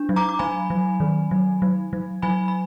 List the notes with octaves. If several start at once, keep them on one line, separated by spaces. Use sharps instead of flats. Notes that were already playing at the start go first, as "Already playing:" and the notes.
Already playing: D4
F#3
A#5 D6
D6
F#3 G#5 B5
F#3
D#3
F#3
F#3
F#3
F#3 G#5 B5
B5